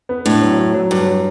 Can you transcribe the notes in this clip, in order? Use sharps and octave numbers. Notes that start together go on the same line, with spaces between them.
B3
A2 D4
F#3
F#3
F#3
G2 F#3
F#3